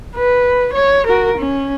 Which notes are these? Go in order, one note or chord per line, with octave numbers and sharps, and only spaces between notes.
B4
C#5
F#4 A#4
C#4